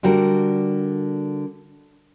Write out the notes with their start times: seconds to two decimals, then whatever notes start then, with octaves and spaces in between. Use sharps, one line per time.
0.03 D3 G3 F#4 A#4